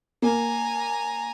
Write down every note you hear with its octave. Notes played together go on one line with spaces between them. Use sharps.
A#3 G#5 A#5